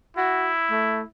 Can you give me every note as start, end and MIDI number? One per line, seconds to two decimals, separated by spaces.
0.17 1.06 64
0.17 0.51 66
0.71 1.02 57